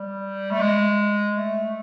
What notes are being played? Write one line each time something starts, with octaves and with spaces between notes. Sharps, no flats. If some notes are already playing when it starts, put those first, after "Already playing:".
Already playing: G3
A3
G#3
A3